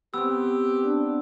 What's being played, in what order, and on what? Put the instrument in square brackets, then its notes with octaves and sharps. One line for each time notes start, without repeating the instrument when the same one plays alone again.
[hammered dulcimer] B3 C4 [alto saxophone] G4 [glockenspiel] E6
[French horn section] D4